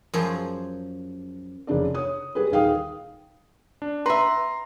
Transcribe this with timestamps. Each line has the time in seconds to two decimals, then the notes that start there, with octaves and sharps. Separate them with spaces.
0.14 F#2 F3 G#4 C5
1.67 F1 C#3 D4 D5
1.95 C#5 D#6
2.35 G3 G#4 B4
2.51 D#1 D#3 G#4 F5 G5 D#6
3.82 D4
4.06 B4 E5 A#5 C6